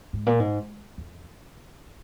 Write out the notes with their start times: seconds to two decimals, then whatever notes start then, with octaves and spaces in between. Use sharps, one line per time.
0.13 G#2
0.26 A#2
0.40 G#2
0.98 F2